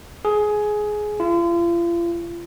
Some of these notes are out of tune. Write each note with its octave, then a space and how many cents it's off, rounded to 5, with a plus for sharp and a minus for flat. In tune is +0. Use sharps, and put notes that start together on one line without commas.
G#4 +15
F4 -40